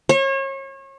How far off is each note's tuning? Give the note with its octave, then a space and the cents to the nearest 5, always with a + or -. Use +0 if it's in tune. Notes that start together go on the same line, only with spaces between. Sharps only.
C#5 -35